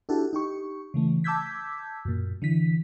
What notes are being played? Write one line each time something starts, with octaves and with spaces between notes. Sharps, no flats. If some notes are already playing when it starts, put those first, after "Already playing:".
D4 E4 F#4 G4 A4
D#4 G4 C#6
C#3 E3 A3
A5 D6 E6 G6 G#6 B6
F#2 A#2
D3 E3 B6